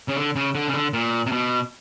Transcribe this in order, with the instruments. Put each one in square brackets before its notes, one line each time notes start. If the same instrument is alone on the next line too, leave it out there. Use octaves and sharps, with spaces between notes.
[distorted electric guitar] C#3
D3
C#3
D3
C#3
D3
A#2
C3
B2